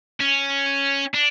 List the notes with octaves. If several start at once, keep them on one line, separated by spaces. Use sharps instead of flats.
C#4
D4